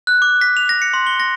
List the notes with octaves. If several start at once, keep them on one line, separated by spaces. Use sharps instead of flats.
F#6
D6
B6
F7
A#6
C#7
C6
G7
A#6